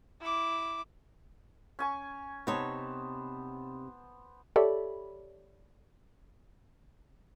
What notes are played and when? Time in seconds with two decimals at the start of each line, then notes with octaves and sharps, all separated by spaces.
0.21 E4 D6
1.79 C#4 G#5 C#6
2.47 C3 B3 D#4 C5 C#5 A5
4.56 G4 A4 C#5 D5 E5 B5